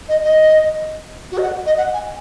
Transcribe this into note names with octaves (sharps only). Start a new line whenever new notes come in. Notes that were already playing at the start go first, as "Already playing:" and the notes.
D#5
D#5
F#4
D#5
F#5
D#5
F#5
G#5